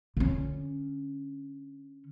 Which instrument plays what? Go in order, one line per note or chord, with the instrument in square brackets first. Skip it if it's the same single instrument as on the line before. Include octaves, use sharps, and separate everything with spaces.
[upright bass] D3 C#4